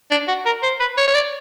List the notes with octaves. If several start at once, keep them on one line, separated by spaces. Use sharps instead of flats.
D4
F#4
A#4
C5
B4
C#5
C#5
D5